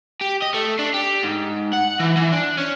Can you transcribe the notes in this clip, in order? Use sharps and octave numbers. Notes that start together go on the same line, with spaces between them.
G4
D#5
A3
D4
G4
G#2
F#5
E3
E3
D4
C#4